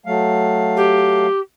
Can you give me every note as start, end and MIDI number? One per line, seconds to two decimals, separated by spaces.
0.06 1.27 54
0.06 1.27 57
0.06 1.27 77
0.76 1.40 67